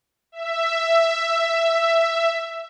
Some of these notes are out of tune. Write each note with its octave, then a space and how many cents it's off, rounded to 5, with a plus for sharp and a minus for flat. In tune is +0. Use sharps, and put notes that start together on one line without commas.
E5 +10